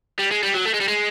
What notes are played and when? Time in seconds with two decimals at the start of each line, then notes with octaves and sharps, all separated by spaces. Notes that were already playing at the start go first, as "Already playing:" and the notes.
0.19 G3
0.31 G#3
0.43 G3
0.54 F#3
0.65 A3
0.74 G#3
0.80 G3
0.88 G#3